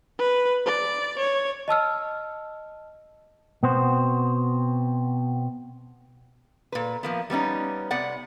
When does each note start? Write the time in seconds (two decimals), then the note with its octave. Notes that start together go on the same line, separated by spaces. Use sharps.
0.19 B4
0.66 D5
1.19 C#5
1.68 D#5 A5 E6 F6
3.63 B2 B3 C4 F#4 C5
6.72 A#2 B4
7.03 F3 A#3 B3
7.30 G3 B3 C#4 D#4
7.91 C3 B3 D5 F#5